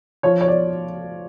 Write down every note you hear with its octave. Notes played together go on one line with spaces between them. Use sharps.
F3 C#5
C#5
D5